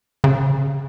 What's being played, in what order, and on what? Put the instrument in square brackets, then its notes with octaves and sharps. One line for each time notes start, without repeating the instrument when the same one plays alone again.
[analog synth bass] C#3